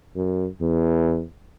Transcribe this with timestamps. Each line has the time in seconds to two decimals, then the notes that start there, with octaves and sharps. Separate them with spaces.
0.16 F#2
0.61 E2